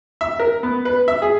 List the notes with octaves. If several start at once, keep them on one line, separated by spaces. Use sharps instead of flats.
E5
A#4
B3
B4
E5
G#4